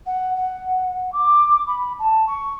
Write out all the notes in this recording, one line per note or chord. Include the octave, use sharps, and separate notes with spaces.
F#5
F#5
D6
B5
A5
C#6